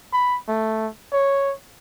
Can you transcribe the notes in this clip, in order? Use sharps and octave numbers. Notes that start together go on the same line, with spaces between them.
B5
A3
C#5